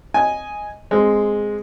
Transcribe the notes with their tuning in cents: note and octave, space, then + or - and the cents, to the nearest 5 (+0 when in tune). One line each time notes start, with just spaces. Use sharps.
D#5 +5 G#5 +0
G#3 +0 C4 +0